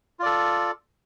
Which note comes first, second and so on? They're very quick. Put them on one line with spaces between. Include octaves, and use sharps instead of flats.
F4 D5 A4